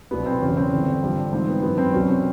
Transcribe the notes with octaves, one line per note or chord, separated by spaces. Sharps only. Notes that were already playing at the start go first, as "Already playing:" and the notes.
C2 B2 F#3 B3
C4
E2 C#3 E3 C#4
C4
G2 D3 F3
G2 D3 F3
G#2 E3 C4
B3
F#2 D#3 F#3 B3
C4
C2 B2 F#3 C#4
C4